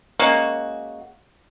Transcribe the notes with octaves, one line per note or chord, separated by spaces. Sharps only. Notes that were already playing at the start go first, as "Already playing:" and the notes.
G#3 A#3 C#4 F#4